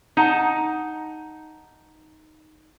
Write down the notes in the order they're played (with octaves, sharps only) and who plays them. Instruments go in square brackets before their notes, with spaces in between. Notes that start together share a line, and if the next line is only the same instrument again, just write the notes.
[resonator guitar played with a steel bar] D#4 F#5 A5